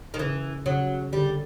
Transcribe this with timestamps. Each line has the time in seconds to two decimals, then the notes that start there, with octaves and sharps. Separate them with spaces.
0.14 D#3
0.19 C#3 E3
0.66 C#3 F#3
1.13 D3 G3